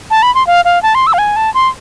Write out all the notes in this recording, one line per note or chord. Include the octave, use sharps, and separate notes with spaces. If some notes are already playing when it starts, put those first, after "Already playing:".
A5
B5
C6
F5
F5
A5
C6
E6
F5
G#5
A5
C6